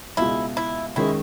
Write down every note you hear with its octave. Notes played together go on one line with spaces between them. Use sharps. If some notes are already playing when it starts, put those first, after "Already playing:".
C#2 B2 G#3 E4
E4
D#3 G#3 C#4 E4 G#4